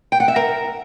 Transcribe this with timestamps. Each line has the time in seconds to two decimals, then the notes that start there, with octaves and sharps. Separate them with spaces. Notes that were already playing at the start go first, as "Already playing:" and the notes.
0.12 G5
0.20 F#5
0.28 E5
0.36 A#4